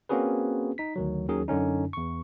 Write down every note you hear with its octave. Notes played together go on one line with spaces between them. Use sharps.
A#3 C4 C#4 F#4 G#4 B4
D#4 B6
D2 D#3 F#3
D#2 D#3 F#3 C#4 G#4
F#2 D3 C#4 D#4
E2 C#6